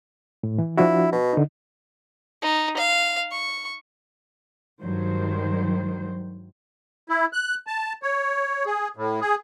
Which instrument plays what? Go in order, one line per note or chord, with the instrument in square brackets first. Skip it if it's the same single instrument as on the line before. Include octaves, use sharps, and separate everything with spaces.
[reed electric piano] A2
E3
[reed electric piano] F3 D4 F#4 [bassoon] E4
[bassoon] B2
[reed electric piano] D3 D#4
[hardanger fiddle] D#4
F5
C#6
[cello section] G2 D#3 F#3 G#3 C5
[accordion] E4
F#6
A5
C#5
G#4
A2
G#4